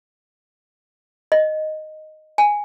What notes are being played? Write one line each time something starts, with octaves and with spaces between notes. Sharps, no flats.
D#5
G#5